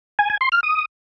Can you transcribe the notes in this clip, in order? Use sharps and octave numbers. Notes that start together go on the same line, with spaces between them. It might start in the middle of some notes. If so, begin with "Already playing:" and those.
G#5
G#5
C6
F6
D#6